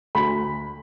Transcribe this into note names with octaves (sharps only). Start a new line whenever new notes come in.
D2 B5